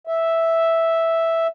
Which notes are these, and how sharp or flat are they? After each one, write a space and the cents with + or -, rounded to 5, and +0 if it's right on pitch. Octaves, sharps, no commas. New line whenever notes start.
E5 -5